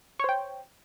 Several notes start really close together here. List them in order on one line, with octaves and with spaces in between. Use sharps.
C#5 C5 G5